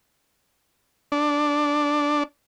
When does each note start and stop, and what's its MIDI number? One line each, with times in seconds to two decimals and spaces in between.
1.12 2.23 62